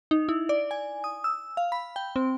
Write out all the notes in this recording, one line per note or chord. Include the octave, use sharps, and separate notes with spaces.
D#4
E4
D5
G#5
D#6
E6
F5
B5
G5
C4